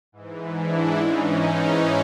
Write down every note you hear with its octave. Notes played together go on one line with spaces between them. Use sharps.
G#2 E3
D4 E4
G#2 E3 C#4 D#4